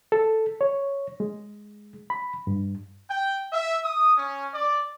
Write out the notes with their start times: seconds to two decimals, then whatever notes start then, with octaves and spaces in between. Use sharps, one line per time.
0.12 A4
0.61 C#5
1.20 G#3
2.10 B5
2.47 G2
3.09 G5
3.53 E5
3.84 D#6
4.16 C#4
4.54 D5